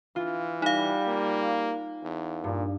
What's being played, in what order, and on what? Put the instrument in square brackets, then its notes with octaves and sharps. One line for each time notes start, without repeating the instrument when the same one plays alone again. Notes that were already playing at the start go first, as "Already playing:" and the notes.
[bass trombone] E3 [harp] F4
[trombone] G3 [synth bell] D#4 F5
[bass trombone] A#3
E2
[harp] G2 [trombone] A#2